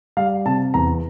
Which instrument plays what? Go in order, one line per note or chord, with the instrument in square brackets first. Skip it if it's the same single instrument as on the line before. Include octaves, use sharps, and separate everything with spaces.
[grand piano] G3 F5
C3 A5
E2 A#5